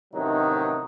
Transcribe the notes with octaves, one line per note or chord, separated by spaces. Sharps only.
A1 C3 D#3 F#3 A3 D#4